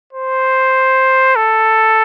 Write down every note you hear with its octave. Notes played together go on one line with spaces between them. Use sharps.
C5
A4